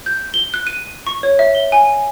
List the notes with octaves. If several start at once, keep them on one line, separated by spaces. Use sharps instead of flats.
G6
G7
F#6
D#7
C#6
C#5
E5
G7
G#5